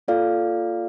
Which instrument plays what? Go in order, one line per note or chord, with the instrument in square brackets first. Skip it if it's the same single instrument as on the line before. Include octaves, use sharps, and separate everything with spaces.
[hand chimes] A#3 F4 A4 D5 F5